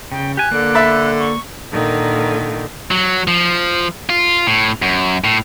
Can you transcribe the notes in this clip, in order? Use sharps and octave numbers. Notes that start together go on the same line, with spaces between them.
C#3 G5
G4 G#5 F#6
D3 A#3 D5
E5 B5 A6
C#6
A#2 D3 D#3
F#3
F3
F4
A2
F#2
A2